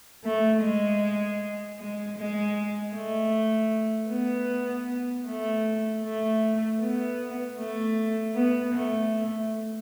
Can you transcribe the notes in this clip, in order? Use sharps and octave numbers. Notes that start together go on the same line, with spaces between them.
A3
G#3
G#3
G#3
A3
B3
A3
A3
B3
A3
B3
A3